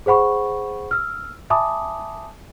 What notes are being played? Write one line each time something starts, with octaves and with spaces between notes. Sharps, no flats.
G#4 C5 F#5 B5 C#6
E6 F6
E5 G#5 A5 B5 D6 D#6